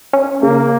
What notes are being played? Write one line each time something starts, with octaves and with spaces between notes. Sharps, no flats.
C#4
C#3 A#3